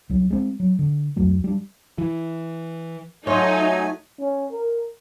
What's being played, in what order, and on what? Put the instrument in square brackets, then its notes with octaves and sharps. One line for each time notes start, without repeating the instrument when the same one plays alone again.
[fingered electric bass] C2 F#3
G#3 C4
F#3
D3
C2 F2 F#3 A3
G3 D4
[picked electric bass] E3
[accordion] F#3 A3 G#5 [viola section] D#4 [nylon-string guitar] F4 C#5
[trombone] C#4
A#4